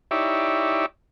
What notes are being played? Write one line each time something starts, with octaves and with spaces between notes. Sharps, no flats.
D#4 E4 G4 C#5 D5 E5